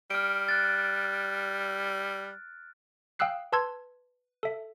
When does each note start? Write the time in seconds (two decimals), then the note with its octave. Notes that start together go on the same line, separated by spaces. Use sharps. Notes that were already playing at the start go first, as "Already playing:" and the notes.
0.10 G3 F6 D7
0.48 F#6 A6
3.19 F5 G5 D#6 E6 F#6 C7
3.52 B4 A5 C6 E6 G#6
4.43 A4 E5